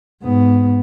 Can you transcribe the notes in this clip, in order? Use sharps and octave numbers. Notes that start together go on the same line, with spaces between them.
G#2 B3